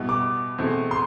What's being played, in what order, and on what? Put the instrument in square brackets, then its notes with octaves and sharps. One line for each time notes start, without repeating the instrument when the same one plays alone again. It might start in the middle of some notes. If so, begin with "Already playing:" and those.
Already playing: [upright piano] B2 G3 B3 E4
[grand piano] D6
[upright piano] E2 B2 A3 C4 E4
[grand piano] C6